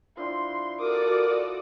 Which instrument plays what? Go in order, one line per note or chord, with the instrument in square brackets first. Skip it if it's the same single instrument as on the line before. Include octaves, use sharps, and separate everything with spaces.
[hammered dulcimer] F3 D4 E4 [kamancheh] C6
[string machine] F#4 A4 D5 [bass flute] A#4 [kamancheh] D6 D#6